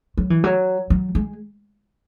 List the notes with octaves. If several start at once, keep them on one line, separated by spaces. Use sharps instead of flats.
F#3
E3
F#3
F#3
G#3